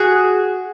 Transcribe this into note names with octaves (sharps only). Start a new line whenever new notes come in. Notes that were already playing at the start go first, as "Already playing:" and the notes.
Already playing: F#4 G#4